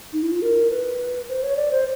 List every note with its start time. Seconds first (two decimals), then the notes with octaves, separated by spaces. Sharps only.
0.13 D#4
0.22 E4
0.32 F4
0.42 A#4
0.71 B4
1.29 C5
1.43 C#5
1.56 D5
1.71 C5